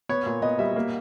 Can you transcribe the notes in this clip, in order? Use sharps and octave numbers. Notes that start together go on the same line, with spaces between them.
B3 C#5
A#2
B3 D#5
G3 E5
A#3